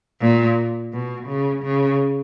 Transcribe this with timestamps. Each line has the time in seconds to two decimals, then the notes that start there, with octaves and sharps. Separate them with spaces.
0.21 A#2
0.93 B2
1.27 C#3
1.63 C#3